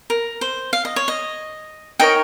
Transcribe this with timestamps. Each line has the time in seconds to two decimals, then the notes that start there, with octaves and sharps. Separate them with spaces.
0.10 A#4
0.41 C5
0.73 F5
0.85 D#5
0.96 C#5
1.08 D#5
1.99 D#4 A#4 C#5 G5